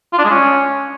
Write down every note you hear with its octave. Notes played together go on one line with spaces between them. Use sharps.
F4
D4
G#3
C#4